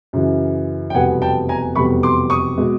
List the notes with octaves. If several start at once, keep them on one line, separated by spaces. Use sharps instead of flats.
F#2 C#3 E3
G5
F1 E2 B2 G3 B3 F#5 G#5
G5 A5
G#5 A#5
F1 E2 B2 G3 B3 B5 C#6
C6 D6
C#6 D#6
B2 G#3